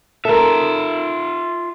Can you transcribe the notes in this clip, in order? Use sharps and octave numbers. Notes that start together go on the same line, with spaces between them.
F4 A4 A#4 E5